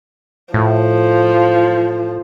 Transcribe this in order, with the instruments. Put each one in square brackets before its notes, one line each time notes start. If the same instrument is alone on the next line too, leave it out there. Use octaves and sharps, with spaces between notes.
[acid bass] A2 [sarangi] F3